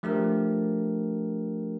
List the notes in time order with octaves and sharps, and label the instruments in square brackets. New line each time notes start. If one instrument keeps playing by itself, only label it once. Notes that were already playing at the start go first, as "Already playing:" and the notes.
[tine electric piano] F3 A3 D4 G4 A#4